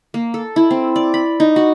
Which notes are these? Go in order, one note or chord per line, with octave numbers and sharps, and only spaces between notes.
A#3
A4
E4
C4
D5
B5
D#4
F#4